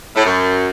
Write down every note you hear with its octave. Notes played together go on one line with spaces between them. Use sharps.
A2
F#2